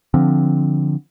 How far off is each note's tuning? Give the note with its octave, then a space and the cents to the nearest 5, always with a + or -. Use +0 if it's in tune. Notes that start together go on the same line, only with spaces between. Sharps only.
D3 +0 F3 +0 C4 -5